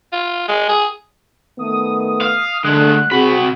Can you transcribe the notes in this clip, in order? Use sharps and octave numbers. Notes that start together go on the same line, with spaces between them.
F4
G#3
G#4
D#3 A3 B3 D#6
F5
D3 G#3 A3 F#6
C3 C4 F#4 G#4 B5